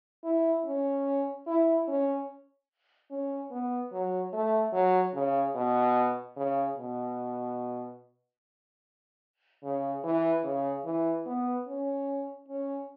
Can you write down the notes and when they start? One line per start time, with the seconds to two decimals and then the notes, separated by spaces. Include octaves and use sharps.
0.24 E4
0.66 C#4
1.47 E4
1.88 C#4
3.11 C#4
3.51 B3
3.92 F#3
4.33 A3
4.73 F#3
5.14 C#3
5.55 B2
6.37 C#3
6.78 B2
9.63 C#3
10.04 E3
10.44 C#3
10.85 E3
11.26 B3
11.67 C#4
12.48 C#4